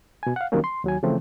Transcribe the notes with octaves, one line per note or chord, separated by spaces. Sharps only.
B2 G#5
F5 F#5
D#3 F#3 G3 A#3 C4 C#4
C6
D#2 F#3 G#5
C#3 E3 F3 A3 C4